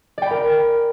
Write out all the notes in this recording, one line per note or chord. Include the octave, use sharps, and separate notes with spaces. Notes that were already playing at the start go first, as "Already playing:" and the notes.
A#4 D5 G5 B5